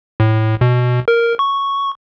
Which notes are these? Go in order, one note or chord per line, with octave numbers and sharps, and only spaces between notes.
A2
B2
A#4
C#6